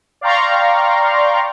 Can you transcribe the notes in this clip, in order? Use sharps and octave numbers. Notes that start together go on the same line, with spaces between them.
D5 F5 G5 A#5 C6 C#6